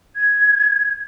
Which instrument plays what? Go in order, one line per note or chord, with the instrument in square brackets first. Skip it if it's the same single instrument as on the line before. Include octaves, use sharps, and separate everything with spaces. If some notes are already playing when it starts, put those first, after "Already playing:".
[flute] G#6